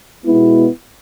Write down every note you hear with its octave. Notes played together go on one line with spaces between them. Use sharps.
B2 G#3 B3 E4